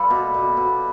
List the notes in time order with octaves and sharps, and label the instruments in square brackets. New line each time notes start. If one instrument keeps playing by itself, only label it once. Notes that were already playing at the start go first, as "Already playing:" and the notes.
Already playing: [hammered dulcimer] G3 F4 G4 A4 B4
B2
B2
B2